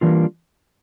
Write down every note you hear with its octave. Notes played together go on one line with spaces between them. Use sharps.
E3 G3 A#3 D4 F4